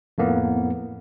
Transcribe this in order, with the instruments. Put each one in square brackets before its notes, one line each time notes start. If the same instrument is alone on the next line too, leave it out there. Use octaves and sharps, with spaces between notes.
[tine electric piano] F2 A2 A#3 B3